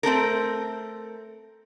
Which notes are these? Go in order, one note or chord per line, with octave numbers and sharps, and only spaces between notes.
A3 C4 A4 A#4